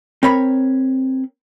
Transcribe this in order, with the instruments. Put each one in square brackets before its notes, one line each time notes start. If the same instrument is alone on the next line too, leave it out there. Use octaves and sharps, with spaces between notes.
[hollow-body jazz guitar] C4 A#4 C#5 B5